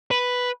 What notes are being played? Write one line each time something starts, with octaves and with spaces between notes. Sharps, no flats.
B4